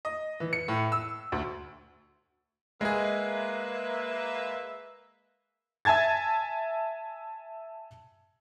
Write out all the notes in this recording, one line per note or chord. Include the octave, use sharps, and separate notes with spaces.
D#5
E3
C#7
A2
E6
D2
G#3 A#3 G#4 B4 E5
E5 G#5 A5 G#6 A6